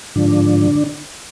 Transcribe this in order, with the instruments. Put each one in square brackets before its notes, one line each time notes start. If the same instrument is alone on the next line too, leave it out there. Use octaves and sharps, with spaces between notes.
[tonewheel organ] G#2 D3 F3 D4